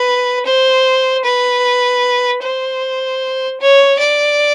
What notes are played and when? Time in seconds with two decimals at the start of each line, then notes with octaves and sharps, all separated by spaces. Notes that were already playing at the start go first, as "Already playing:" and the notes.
Already playing: B4
0.46 C5
1.25 B4
2.42 C5
3.61 C#5
3.99 D5